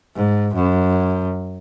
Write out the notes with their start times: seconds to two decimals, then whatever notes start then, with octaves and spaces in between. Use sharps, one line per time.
0.15 G#2
0.55 F#2